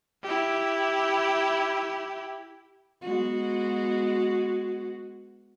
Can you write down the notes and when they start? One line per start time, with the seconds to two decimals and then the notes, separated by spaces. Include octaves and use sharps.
0.23 E4 G4
3.02 G#3 B3 F#4